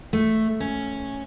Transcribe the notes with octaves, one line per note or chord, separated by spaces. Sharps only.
A3
C#4